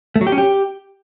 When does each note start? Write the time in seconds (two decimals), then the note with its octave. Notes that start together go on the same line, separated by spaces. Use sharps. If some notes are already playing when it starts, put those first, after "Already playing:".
0.16 A3
0.21 F#3
0.27 G4
0.32 C#4
0.38 G4